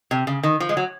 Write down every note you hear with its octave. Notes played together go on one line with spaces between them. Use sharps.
C3
C#3
D#3
F3
G#3
F#3